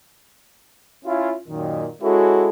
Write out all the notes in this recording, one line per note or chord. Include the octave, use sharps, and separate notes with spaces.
C#4 E4 F4
F#2 A#2 D#3
G#3 C#4 E4 F#4 A4